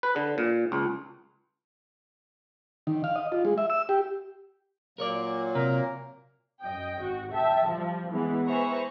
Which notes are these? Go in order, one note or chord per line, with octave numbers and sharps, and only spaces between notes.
B4
D3
A#2
C#2
D#3
F5
D#5
F4
G#3
E5
E6
G4
A#2 F#3 A#3 A#4 C#5 D5
C3 A#4
F#2 D#5 G5
G#1 F#4
E5 G5 A5
F3 G3
E3 G#3 B3
G#4 B4 C5 E5 A#5 C#6